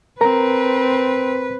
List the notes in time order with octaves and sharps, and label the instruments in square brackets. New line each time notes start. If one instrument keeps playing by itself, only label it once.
[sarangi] C4 [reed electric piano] A#4 A#5 [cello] B4